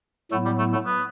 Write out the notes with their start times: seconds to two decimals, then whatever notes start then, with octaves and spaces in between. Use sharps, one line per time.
0.31 A2 F#3 A3 B3 E4
0.45 G3
0.59 A3
0.73 A3
0.86 B3